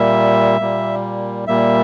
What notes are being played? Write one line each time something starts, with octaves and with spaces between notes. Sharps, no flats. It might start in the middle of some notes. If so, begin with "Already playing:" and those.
Already playing: A#2 G3 A#3 E5
A#2 G3 A#3
A#2 G3 A#3 E5